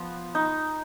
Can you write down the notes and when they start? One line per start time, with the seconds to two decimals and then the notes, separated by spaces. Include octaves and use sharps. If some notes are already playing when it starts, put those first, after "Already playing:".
Already playing: F3 B3
0.35 D#4